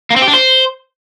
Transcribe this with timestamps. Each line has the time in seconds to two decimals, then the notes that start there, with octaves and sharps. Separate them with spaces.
0.10 A#3
0.16 C4
0.22 G4
0.28 D4
0.33 C5